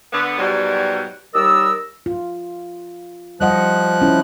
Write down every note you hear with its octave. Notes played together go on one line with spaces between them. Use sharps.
D3 B3
G#2 B2 F#3 G3
D#2 G3 A#4 D5 D#5 E6
F4
F3 G3 D#5 F#5 F#6
C#4 E4